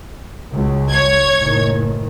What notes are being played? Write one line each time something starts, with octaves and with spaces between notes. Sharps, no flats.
C#2 F#3
C#5 G#6
F#1 A2 D#3